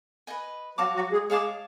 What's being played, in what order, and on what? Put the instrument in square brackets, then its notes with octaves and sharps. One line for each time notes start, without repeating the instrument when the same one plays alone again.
[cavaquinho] B4 D#5 G#5
[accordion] F#3 F#4 [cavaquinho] C#5 F5 A5 D6
[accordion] F#3 F#4
G#3 G#4
[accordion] G#3 G#4 [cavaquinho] C#5 F5 A5 D6